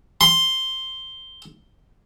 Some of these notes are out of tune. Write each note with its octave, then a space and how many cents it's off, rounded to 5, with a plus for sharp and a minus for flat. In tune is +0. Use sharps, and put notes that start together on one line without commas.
C6 +5